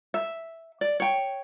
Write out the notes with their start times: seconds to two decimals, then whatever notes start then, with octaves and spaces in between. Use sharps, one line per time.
0.14 E5
0.81 D5
1.00 C#5 G5